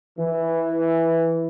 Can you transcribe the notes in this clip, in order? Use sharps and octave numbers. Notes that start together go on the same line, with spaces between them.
E3